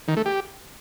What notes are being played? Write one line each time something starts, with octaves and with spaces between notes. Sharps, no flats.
D#3
A3
G4